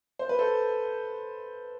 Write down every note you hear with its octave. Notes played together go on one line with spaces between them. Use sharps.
C5
B4
A4 C5